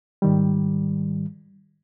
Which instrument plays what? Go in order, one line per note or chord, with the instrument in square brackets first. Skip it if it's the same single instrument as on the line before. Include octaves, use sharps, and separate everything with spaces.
[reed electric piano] G#2 D#3 G3